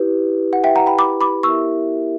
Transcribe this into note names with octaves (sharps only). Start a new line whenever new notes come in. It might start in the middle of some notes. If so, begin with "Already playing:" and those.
Already playing: E4 G4 B4
F#5
E5 G5
F#5 A#5
G5 B5
B5 D6
B5 D6
B3 E4 G4 A#4 E5 C#6 E6